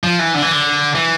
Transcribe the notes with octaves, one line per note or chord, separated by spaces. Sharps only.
F3
E3
D3
E3
D3
E3